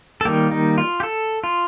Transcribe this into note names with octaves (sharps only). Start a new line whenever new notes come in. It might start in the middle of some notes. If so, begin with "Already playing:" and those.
A4
D#3 G3 A#3 G4
D#4
F4
G4
A4
F4